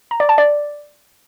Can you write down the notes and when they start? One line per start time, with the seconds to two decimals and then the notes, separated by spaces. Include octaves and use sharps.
0.11 A#5
0.20 D5
0.29 A5
0.38 D5